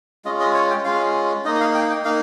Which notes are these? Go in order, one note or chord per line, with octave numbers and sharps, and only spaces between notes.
G#3 C#4 F4 D#5
D#5
C#5
G5
G#3 C#4 F4 F5
A#3 D#4 D#5
D#5
F5
G5
G5
A#3 D#4 F5